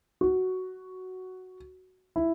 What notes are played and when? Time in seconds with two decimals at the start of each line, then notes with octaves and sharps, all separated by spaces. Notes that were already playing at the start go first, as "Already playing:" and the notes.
0.21 F#4
2.16 E4